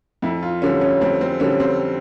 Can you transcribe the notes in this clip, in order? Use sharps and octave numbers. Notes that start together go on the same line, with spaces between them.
F2 E4
F4
D3 G3 C#4
C#4
F2 C4
C4
D3 G3 C#4
C4